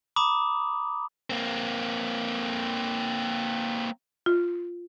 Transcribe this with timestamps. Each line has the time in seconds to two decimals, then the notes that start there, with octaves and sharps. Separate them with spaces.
0.16 A#5 B5 D6 D#6
1.30 A#3 C4
4.26 F4